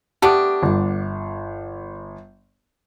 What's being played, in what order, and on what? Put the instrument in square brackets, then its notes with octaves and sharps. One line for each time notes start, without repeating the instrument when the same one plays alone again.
[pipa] A3 B3 D4 [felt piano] G4 D6
[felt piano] G1